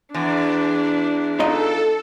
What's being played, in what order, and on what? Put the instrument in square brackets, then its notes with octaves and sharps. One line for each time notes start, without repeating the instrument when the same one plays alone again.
[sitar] E2 [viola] D4
[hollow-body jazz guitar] D#4 F4 D#5 [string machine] A4